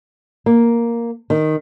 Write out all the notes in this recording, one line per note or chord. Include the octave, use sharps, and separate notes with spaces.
A#3
D#3